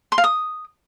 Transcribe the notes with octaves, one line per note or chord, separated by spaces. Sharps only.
C6
F5
D#6